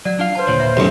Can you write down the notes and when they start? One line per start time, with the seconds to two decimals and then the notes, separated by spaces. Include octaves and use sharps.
0.05 F#3 D5 F#5
0.19 D4 F4 F5
0.35 B4 C5 F#5 A5
0.47 D#2 A#2 D3 C#5
0.60 E5 F#5 B5
0.77 B1 F#2 D#3 A3